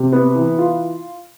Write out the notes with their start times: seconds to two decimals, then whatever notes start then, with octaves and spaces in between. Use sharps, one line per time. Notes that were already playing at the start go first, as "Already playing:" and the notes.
Already playing: C3
0.12 B3
0.35 E3
0.58 F4